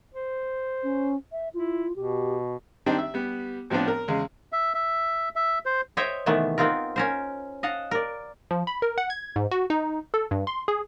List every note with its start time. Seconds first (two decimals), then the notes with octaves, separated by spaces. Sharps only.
0.14 C5
0.83 C#4
1.32 E5
1.54 E4 F4
1.96 B2 G4
2.86 D#3 G3 C4 D4 D#4
2.98 E5
3.14 G3 B3
3.70 A2 F3 B3 C4 D4
3.88 A#4
4.08 E2 C#3 G#3
4.52 E5
4.74 E5
5.36 E5
5.66 C5
5.97 C5 C#5 D#5 E5 G5
6.26 C3 D#3 E3 A3 B3
6.58 B3 C4 D#4 F4 A#4
6.96 C#4 A#4 C5
7.63 D#5 F5 F#5 A5
7.91 A#4 D5
8.51 F3
8.67 B5
8.82 A#4
8.98 F#5
9.10 G#6
9.36 G#2
9.51 F#4
9.70 D#4
10.14 A4
10.31 G2
10.47 C6
10.68 G#4